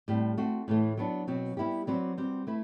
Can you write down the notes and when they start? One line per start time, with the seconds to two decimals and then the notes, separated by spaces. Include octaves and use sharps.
0.08 A2 G3 C4
0.37 A3 C4 F#4
0.68 A2 E3 A3
0.97 F#3 B3 D4
1.28 B2 F#3 C4
1.57 G3 B3 E4 G4
1.87 F#3 C4 F#4 B4 D5
2.18 G3 C4 F#4
2.47 A3 E4 B4